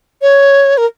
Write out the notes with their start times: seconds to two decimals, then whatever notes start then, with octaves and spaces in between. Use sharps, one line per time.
0.22 C#5
0.77 A#4